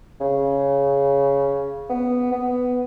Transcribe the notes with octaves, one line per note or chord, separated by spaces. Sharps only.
C#3
B3
B3